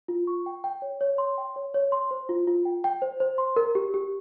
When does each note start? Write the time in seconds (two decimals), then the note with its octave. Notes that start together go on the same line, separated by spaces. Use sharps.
0.08 F4
0.27 C#6
0.46 G5
0.64 G5
0.82 C#5
1.01 C#5
1.18 C6
1.38 G5
1.56 C#5
1.74 C#5
1.92 C6
2.11 C5
2.29 F4
2.47 F4
2.65 G5
2.84 G5
3.02 C5
3.20 C5
3.38 C6
3.56 A#4
3.75 G4
3.94 G4